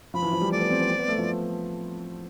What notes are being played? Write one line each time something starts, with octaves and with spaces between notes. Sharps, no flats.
F3 B5
E3
F3
G3
A3 D5
B3
C4
B3
C4
B3
A3
F3